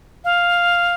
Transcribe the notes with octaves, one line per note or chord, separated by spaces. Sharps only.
F5